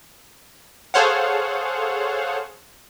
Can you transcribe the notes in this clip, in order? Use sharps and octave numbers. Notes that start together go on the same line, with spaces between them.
G#4 A4 C5 C#5 F5 F#5